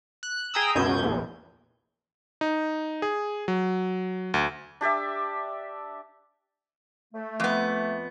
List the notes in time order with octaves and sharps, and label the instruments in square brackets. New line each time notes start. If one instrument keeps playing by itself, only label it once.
[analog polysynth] F#6
G#4 G5 A#5 D#6 E6
C#2 F#2 B2 G6 G#6
A#1 E2
[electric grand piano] D#4
G#4
F#3
D2
[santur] D4 G4 D5 E5
[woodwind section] A3
[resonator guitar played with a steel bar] F2 B3